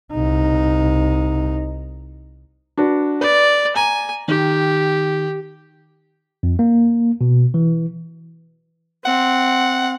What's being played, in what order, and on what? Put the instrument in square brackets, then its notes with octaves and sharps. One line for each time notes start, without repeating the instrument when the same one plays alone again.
[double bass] C2 D#4
[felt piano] D4 F#4 B4
[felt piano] B4 [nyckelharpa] D5
[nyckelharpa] G#5 [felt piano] A#5
[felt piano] D#3 [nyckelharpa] G4
[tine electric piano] F2
A#3
B2
E3
[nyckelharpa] C4 [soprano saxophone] F#5